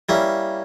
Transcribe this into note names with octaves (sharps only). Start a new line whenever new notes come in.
G3 A#3 C#4 E4